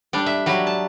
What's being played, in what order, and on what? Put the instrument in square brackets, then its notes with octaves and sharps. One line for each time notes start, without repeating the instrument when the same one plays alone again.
[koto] G3 D4
E5
F#3 G3
A5